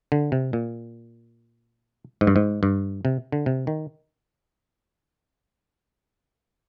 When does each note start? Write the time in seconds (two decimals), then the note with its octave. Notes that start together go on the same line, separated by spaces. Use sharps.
0.12 D3
0.32 C3
0.53 A#2
2.21 G#2
2.27 G2
2.36 G#2
2.63 G2
3.05 C3
3.32 D3
3.46 C3
3.67 D#3